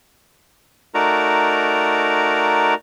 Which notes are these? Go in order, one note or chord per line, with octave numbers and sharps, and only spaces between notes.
A3 D#4 F#4 A#4 D5 A#5